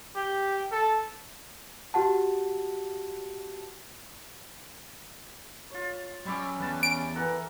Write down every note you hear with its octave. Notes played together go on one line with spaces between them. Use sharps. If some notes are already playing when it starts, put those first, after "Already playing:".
G4
A4
F#4 G4 F#5 A5
F4 C#5
F#3 G3 C#4 E5 D6
E2 B4 F5 A5
C#4 D7
E3 A4 A#4 F#5